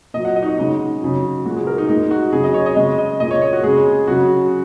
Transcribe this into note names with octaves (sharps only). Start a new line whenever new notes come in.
A#2 F#3 D#5
F#5
D#5
D#4
F#4
C#3 G#3 D#4
C#3 F#3
A#2 G#3 F#4
G#4
A#4
D#4
A#2 G#3 D#4
F#4
C#3 F#3 G#4
D#5
C#5
D#5
C#3 G#3 D#5
D#5
A#2 G#3 D#5
C#5
C#5
F#4
C#3 G#3 G#4
C#3 F#3 F#4